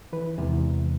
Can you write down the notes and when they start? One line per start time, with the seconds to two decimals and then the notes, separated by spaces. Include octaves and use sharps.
0.13 E3 B4
0.38 E2 C3 E3 G#3